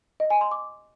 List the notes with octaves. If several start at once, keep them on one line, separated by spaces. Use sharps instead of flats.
D#5
G#5
C6
D6